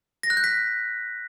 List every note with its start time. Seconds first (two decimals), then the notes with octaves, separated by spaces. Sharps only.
0.23 A#6
0.30 F#6
0.37 G6
0.44 B6